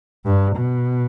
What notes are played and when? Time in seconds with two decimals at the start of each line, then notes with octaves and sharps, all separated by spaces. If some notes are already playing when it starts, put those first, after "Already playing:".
0.25 G2
0.57 B2